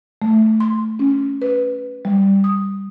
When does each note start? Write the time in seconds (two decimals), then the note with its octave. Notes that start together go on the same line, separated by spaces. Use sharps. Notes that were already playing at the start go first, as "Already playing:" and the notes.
0.22 A3
0.60 C6
0.99 C#4
1.42 B4
2.05 G3
2.44 D#6